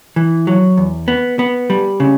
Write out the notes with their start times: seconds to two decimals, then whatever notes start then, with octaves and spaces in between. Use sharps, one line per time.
0.16 E3
0.47 F#3
0.77 E2
1.08 B3
1.39 B3
1.70 G3
2.00 C#3